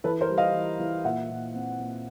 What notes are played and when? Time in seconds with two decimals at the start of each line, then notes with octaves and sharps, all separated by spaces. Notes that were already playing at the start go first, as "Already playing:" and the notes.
0.04 E3 A4 B4
0.21 A#4 C5
0.29 G3
0.38 D#5 F5
0.54 E3
0.79 E3
1.04 A#2 E5 F#5
1.30 A#2
1.54 C4
1.79 A#2